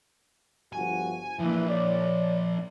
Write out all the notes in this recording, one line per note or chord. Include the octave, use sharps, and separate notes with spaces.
G1 F3 F#4 G#5
E3 F3 A#3
C#5 D5